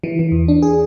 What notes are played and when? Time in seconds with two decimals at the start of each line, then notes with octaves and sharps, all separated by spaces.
0.04 E3
0.19 E3
0.32 E2
0.48 D4
0.62 G#4